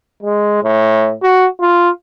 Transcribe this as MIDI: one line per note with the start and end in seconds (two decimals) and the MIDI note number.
0.23 0.62 56
0.63 1.13 45
1.22 1.46 66
1.60 1.89 65